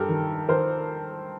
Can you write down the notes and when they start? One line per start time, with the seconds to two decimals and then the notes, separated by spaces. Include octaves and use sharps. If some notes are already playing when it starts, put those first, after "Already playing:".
Already playing: G2 G4 A4 A#4
0.09 D#3
0.49 D#3 A#4 C5